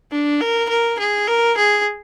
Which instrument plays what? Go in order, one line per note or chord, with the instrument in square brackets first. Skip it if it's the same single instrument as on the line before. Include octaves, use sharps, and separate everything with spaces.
[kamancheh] D4
A#4
A#4
G#4
A#4
G#4